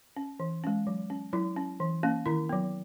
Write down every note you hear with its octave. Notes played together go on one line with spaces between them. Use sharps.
C#4
E3
G#3 C#4
F#3
C#4
F#3 E4
C#4
E3
A#3 C#4
D#3 E4
F#3 B3